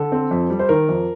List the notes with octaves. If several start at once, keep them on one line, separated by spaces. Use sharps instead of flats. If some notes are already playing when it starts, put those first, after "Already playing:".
Already playing: D3 A4
C4
F2
G3
C5
D#3 A#4
F2